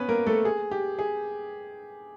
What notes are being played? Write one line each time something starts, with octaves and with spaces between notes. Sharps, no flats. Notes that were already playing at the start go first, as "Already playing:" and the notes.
Already playing: B3 C#4 B4
A#3 A#4
A3 A4
G#4
G4
G#4